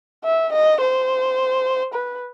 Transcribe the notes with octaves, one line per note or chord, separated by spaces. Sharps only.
E5
D#5
C5
B4